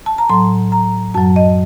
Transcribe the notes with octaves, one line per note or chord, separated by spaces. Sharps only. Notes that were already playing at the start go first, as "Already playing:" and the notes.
A5
A#5
A2 F#3 C6
A#5
F#2 F#3 A5
D#5